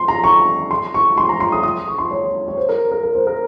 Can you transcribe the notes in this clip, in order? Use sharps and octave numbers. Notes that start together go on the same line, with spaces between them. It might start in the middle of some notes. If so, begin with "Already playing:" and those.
Already playing: C6
A#5
C#6
C6
C#6
C6
A#5
C6
D#6
D#6
C#6
C6
C#5
C#5
C5
A#4
A#4
A#4
C5
A#4